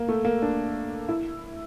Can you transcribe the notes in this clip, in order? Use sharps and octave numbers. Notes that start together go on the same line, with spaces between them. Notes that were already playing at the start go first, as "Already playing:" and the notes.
Already playing: A#3
A3
A#3
D4
E4